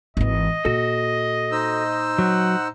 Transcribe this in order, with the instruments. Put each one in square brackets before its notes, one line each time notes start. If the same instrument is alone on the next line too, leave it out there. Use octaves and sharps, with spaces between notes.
[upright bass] G#1 E3 [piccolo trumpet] D#5
[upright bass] A#2 [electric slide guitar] F#4 A4
[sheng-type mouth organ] D#4 C5 E6
[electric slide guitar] F#3 [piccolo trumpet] F#5